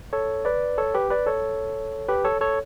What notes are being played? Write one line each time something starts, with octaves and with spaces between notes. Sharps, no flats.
A4 C#5
B4 D5
A4 C#5
G4 B4
B4 D5
A4 C#5
G4 B4
A4 C#5
A4 C#5